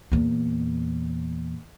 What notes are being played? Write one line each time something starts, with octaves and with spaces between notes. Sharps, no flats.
E2 A#2